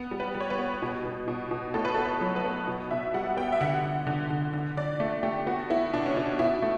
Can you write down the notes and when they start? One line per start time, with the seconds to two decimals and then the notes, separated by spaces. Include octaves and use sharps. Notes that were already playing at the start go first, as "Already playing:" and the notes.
Already playing: B3
0.11 G3
0.20 B4
0.35 G3
0.40 C#5
0.50 B4
0.59 B3
0.82 B2
1.05 B2
1.28 B2
1.51 B2
1.74 A2 A4
1.85 B4
1.95 A4
1.97 B3
2.05 B4
2.21 F#3
2.36 B4
2.44 B3
2.67 B2
2.91 B2 E5
3.14 G3 F#5
3.37 B3 G5
3.52 E5
3.61 D3 F#5
3.84 D3
4.07 D3
4.30 D3
4.53 D3
4.77 D3 D5
5.00 A3
5.23 A3 G4
5.47 B3 F#4
5.70 B3 E4
5.93 B2 D4
6.06 C#4
6.16 B2 D4
6.39 B2 E4
6.62 A3